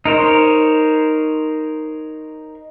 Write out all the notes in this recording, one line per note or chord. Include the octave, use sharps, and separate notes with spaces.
D#4 A#4 C5 C#5